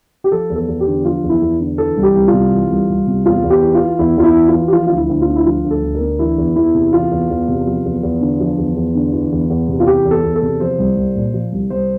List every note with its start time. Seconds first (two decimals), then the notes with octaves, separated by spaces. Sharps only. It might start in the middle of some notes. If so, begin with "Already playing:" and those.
0.24 G4
0.32 F3 A4
0.50 E2
0.56 A4
0.68 E2
0.80 G4
0.87 D3
1.05 F3 F4
1.23 E2
1.29 E4
1.42 E2
1.60 D3
1.78 E3 A4
1.97 C2
2.03 G4
2.15 C2
2.28 F4
2.33 C3
2.52 E3
2.70 C2
2.89 C2
3.07 C3
3.26 E2 F4
3.44 E2
3.50 G4
3.62 E3
3.75 F4
3.81 E3
3.99 E2 E4
4.17 E2 F4
4.23 E4
4.36 E3
4.48 F4
4.54 E3
4.68 G4
4.72 F3 F4
4.87 D2 F4
4.97 E4
5.09 D2
5.21 F4
5.28 D3
5.36 E4
5.45 F3 F4
5.64 D2
5.71 A4
5.82 D2
5.95 A#4
6.01 D3
6.19 E3 E4
6.38 E2
6.56 E2 E4
6.74 C3
6.93 E3 F4
7.11 E2
7.30 E2
7.48 C3
7.67 F3
7.85 E2
8.03 E2
8.21 D3
8.40 F3
8.58 E2
8.76 E2
8.95 D3
9.13 E3
9.32 E2
9.50 E2
9.68 C3
9.80 F4
9.87 E3 G4
10.05 E2
10.11 A4
10.24 E2
10.36 A4
10.42 C3
10.60 F3 C5
10.78 C2
10.97 C2
11.15 A#2
11.34 F3
11.52 C2
11.70 C2 C5